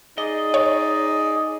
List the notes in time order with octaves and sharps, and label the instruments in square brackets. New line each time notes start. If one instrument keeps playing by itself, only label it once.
[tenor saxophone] D#4 [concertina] G#4 D5 [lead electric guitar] D#5
[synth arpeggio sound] C#5